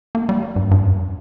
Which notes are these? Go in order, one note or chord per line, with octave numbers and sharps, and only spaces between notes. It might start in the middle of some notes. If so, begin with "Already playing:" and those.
A#3
G3
G2
G2
F2